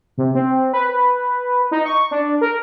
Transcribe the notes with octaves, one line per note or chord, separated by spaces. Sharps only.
C3
C4
B4
B4
D#4
C#6
D4
A#4